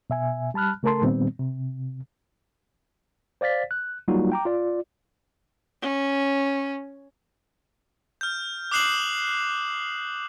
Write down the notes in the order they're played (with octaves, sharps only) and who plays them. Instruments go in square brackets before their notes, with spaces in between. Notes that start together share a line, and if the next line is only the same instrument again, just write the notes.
[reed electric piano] B2 E5 G#5
G3 A5 B5 F6 F#6
C#3 A3 A4 A#4 A5 C6
A#2 D#3 G3 B3 C4
C3
[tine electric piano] C5 D5 F5 A6 B6
F#6
F#3 G3 A#3 D#4 F4 F#4
G5 A#5 D6
F4 D5
[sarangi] C#4
[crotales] F6 G6
D6 D#6 F#6 C7 E7 F#7